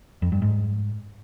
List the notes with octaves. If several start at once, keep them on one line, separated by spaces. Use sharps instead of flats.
F2
G2
G#2